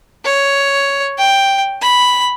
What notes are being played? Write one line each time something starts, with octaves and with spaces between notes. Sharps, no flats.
C#5
G5
B5